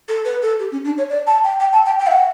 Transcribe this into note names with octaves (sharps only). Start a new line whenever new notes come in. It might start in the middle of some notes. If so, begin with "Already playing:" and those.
A4
B4
A4
G4
C#4
D4
C#5
D5
A5
G5
G5
A5
G5
G5
E5
F#5